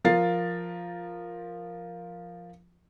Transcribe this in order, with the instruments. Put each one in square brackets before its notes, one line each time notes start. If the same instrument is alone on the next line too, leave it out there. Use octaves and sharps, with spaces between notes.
[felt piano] F3 F4 A#4 A6 C7